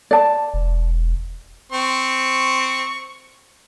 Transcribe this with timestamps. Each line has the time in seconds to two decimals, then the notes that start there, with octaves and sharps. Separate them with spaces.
0.11 D5 A5
0.54 E1
1.72 C4 C#6